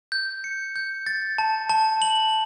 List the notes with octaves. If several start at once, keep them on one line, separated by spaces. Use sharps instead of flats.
G6
C#7
G6
A6
A5
A5
F#7